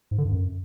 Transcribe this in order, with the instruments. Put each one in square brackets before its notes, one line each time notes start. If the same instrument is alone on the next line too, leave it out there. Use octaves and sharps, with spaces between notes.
[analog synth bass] G#2
D3
G2
F#2